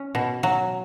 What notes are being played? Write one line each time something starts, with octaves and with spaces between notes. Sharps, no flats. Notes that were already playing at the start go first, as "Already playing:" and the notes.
Already playing: C#4
B2
F#3